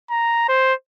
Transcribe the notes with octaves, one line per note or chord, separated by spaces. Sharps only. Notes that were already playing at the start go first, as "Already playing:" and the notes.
A#5
C5